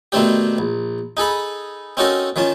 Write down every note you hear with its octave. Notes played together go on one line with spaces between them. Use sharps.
B2 D#3 A3 C4 D4 G4
A#1
D#4 G#4 A4 B5
C4 C#4 D#4 F#4 A4 A#4
D#3 F3 C#4 A5